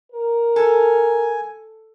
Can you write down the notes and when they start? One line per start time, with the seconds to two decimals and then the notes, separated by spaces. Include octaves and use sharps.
0.12 A#4
0.56 A4 G#5